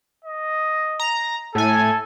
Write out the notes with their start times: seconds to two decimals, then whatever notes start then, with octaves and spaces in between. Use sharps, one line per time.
0.25 D#5
1.00 A#5
1.55 A2 A4 G#5